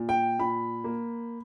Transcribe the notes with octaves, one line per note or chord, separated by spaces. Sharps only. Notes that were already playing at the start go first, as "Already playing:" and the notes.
Already playing: A#2
G5
A#2 B5
A#3